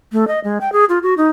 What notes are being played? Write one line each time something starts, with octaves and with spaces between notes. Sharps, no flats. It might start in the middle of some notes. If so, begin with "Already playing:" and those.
A3
D#5
G#3
G5
G#4
F4
F#4
D#4